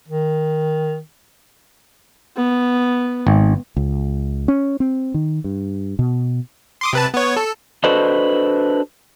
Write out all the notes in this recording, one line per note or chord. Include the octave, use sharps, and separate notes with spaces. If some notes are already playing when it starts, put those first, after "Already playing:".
D#3
B3
G#1
C#2
C#4
C4
D#3
G2
B2
C6 D6 D#6
C3 B4 A5
B3 C#5
A4
D4 F#4 A4 B4 C5 D#5